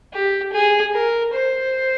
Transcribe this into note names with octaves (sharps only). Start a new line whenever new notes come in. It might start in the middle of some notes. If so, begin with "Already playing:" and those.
G4
G#4
A#4
C5